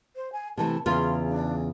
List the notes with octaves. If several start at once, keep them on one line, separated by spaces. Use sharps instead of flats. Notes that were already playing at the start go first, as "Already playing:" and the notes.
C5
G#5
C3 E3 A3 A5
E2 C#3 F4 C6
D4